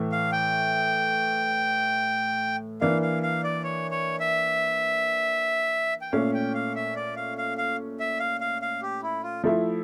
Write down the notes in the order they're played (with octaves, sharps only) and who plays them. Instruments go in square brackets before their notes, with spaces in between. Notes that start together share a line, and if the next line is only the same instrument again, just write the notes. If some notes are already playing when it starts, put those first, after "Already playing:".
Already playing: [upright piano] A2 E3 A3
[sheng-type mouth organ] F5
G5
[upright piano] E3 A#3 D4 [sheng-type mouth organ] F5
[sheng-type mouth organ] F5
F5
D5
C#5
C#5
E5
G5
[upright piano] A#2 A3 C#4 [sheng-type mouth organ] F5
[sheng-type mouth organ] G5
F5
E5
D5
F5
F5
F5
E5
F5
F5
F5
G4
E4
F4
[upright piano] F3 A3 E4